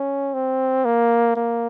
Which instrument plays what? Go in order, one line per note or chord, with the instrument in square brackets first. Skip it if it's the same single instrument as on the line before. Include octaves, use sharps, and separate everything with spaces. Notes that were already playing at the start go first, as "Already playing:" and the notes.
Already playing: [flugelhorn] C#4
C4
A#3
A#3